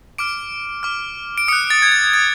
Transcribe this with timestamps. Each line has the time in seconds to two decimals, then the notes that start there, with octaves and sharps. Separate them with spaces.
0.18 D6 F6 D7
0.83 D6 F6
1.38 D7
1.48 D#6 F#6 C#7
1.70 A6
1.82 G#6
1.92 A6
2.13 D#6 F#6 A6